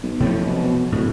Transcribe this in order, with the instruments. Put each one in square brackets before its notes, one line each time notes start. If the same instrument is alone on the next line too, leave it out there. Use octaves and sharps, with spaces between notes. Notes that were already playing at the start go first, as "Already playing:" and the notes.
[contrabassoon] B1
[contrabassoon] A2 [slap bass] C3 F3 F#3
[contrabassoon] B2
[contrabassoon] D1 [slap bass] A2